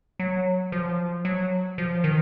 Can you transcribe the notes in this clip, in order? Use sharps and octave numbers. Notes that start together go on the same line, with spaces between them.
F#3
F3
F#3
F3
D#3